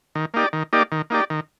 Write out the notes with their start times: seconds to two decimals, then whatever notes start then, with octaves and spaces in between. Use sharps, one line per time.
0.15 D#3
0.34 A#3 D#4 G4 D5
0.53 D#3
0.73 A#3 D#4 G4 D5
0.92 D#3
1.10 A#3 D#4 G4 D5
1.30 D#3